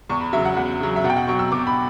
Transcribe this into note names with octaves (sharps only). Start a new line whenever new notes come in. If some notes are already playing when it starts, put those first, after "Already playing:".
E2 C#6
B5
C#3 F#3 E5
F#5
E2 F#5
C#3 F#3
E5
B2 F#5
G5
F#5
F#3 C#6
E6
B2 D6
B5